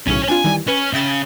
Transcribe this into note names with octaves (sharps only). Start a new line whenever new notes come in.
B1 A2 C#3 C#4
C4 D4 F4 G#5
D#3 E3 G3
C#4 B4
C#3 E5 G5 A6